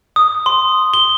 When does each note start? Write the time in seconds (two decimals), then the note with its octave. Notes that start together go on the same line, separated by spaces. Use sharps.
0.16 D#6
0.46 C6
0.94 G7